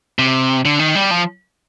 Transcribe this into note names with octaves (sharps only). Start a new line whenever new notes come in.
C3
D3
D#3
G3
F3